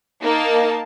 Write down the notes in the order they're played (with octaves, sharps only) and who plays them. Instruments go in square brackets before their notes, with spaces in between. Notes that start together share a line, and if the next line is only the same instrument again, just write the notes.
[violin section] A#3 D#4 A5